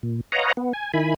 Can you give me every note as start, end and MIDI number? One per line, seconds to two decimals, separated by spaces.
0.03 0.21 46
0.32 0.52 71
0.32 0.52 73
0.32 0.52 75
0.32 0.52 77
0.32 0.52 78
0.32 0.52 82
0.57 0.73 59
0.73 0.92 80
0.94 1.14 51
0.94 1.14 64
0.94 1.14 80
0.94 1.14 83